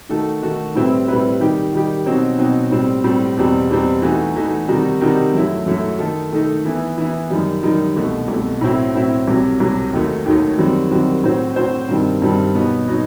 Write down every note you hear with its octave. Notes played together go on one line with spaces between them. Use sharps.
D#3 A3 D#4 F#4 A4
D#3 A3 D#4 F#4 A4
A2 G3 C4 E4 B4
A2 G3 C4 E4 B4
D#3 G3 D#4 G4
D#3 G3 D#4 G4
B2 F#3 C4 D#4
B2 F#3 C4 D#4
A2 G3 C4
A2 G3 C4
E2 B2 G3 C4
E2 B2 G3 C4
E3 A3 D#4 F#4
E3 A3 D#4 F#4
C3 D#3 G3 D#4 F#4
C3 D#3 G3 D#4 F#4
F#2 F#3 A3 E4
F#2 F#3 A3 E4
D#3 A3 D#4 A4
D#3 A3 D#4 A4
E3 B3 E4
E3 B3 E4
F#2 D#3 G3 D#4
F#2 D#3 G3 D#4
C2 B2 A3
C2 B2 A3
A2 F#3 C4 E4
A2 F#3 C4 E4
C2 C3 F#3
C2 C3 F#3
D#2 D#3 F#3 A3 D#4
D#2 D#3 F#3 A3 D#4
F#2 D#3 G3 C4 F#4
F#2 D#3 G3 C4 F#4
A2 F#3 C4 F#4 C5
A2 F#3 C4 F#4 C5
G2 D#3 G3 C4
G2 D#3 G3 C4
B2 F#3 B3 D#4
B2 F#3 B3 D#4